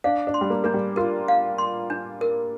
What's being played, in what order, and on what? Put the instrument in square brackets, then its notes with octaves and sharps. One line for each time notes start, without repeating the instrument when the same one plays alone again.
[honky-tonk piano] D4 [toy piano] F5
[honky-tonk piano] D4
[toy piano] C6
[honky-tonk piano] G3
A#3
[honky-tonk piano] A#3 [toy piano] D4
[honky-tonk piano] G3
[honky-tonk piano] F4 [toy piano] A#4
[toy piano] F5
C6
D4
A#4